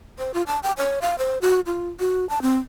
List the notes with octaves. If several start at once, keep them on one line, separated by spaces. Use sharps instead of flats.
C5
F4
A5
G5
C#5
F5
C5
F#4
F4
F#4
A5
C4